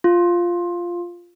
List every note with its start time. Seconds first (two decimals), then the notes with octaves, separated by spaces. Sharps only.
0.04 F4